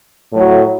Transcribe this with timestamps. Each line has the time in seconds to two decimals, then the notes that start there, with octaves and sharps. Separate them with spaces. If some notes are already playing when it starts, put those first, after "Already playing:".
0.33 A2 F#3